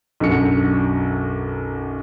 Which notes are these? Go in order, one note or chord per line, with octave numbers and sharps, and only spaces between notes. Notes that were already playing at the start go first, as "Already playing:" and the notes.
B1 F#2 D3 F#4 C#7